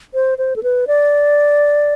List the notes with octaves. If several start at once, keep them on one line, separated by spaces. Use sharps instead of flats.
C5
C5
A4
B4
D5